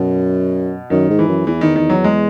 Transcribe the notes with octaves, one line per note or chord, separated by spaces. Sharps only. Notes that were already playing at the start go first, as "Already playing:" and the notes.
Already playing: F#2 B2
F#2 D#3
G#2
E3
F#2
E2 E3
D#3
D#3
F#3
G#3